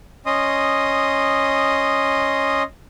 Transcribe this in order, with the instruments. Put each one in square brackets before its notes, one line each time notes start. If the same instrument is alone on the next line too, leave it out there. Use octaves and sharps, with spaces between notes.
[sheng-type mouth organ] C#4 D#5 C6 D#6